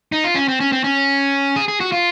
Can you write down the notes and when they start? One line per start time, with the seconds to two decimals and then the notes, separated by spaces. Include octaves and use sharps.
0.12 D#4
0.24 F4
0.35 C#4
0.48 C4
0.60 C#4
0.72 C4
0.84 C#4
1.56 G#4
1.68 G#4
1.80 F#4
1.92 F4